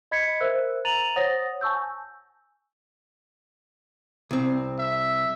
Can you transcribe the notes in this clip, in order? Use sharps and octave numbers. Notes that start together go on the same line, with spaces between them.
D#5 B5 G#6 B6 C#7
A#4 C5 E5 E6 F#6
A#5 A6 D#7 F7 F#7
C5 C#5 F#5 D#6 A6 A#6
G#5 A5 C#6 E6 G6
C2 C4
E5